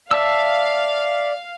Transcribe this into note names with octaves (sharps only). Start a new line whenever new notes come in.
D5 E5 F5 A5 E6